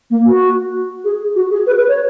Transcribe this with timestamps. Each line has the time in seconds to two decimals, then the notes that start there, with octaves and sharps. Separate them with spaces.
0.10 A#3
0.26 F#4
1.05 G#4
1.36 F#4
1.51 G#4
1.67 B4
1.78 B4
1.88 C#5